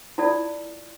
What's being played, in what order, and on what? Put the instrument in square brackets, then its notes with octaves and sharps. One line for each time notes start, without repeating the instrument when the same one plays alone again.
[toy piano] E4 F4 A4 D5